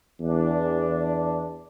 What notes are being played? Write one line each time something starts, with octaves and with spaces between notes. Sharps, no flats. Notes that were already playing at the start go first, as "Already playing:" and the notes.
E2 D4